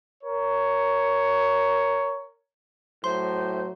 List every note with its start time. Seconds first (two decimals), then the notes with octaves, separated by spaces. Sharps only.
0.24 A#4 C#5
3.04 A2 F#3 C5 C6